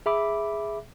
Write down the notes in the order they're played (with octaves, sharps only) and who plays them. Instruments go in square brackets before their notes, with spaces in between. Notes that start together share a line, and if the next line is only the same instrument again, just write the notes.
[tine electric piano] G#4 E5 B5 D6